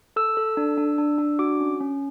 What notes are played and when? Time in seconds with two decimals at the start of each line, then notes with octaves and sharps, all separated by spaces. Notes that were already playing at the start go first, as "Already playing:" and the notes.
0.16 A4 E6
0.37 A4
0.57 D4
0.78 D4
0.98 D4
1.18 D4
1.39 F#4 D6
1.60 C#4
1.80 C#4